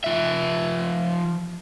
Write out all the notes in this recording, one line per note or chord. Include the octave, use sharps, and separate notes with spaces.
F3 E5